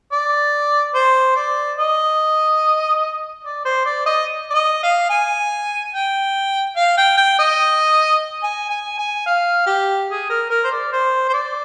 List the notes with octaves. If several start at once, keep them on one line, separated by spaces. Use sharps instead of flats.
D5
C5
D5
D#5
D5
C5
D5
D#5
D5
D#5
F5
G#5
G5
F5
G5
G5
D#5
G#5
G#5
G#5
F5
G4
G#4
A#4
A#4
C5
D5
C5
C5
D5